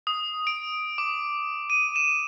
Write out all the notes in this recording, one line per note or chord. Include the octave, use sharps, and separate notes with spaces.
D#6
D7
D6
D#7
E7